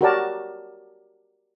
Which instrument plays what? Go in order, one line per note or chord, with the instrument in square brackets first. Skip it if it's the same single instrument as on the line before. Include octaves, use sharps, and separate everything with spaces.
[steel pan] F#4 G4 A#4 C#5 D5 A5